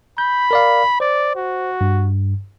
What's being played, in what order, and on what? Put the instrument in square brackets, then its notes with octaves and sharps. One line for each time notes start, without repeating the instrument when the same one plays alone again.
[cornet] B5 [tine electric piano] G6
[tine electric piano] A#4 D5 F5
[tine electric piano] C5 [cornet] D5
[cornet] F#4
[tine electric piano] G2